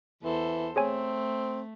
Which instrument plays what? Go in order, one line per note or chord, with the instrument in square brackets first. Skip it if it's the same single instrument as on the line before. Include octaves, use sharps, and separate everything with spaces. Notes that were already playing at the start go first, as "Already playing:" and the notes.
[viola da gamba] E2 A4 C5 [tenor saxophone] E3
[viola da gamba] A3 [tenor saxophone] C4 [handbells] G#4 C#5 G#5